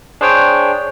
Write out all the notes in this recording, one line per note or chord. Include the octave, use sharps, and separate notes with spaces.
D4 G#4 C5 C#5 G5